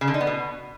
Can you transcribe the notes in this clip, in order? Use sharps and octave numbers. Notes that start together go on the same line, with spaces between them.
C#3
D3
D#4
B3
B2